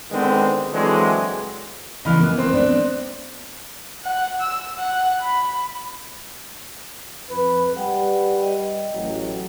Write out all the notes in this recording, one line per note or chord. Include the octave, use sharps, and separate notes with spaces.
D3 D#3 G#3 B3 C4
D3 E3 F#3 G#3 C4
C#3 E3 B3 D#5 B5 F6
A#3 B3
C4 C6
B3 D4
F#5
E6
F#5
B5
F2 B4
G3 B4 F#5 G5
D#5 G5
A1 F#3